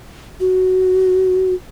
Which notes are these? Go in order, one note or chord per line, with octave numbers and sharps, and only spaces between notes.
F#4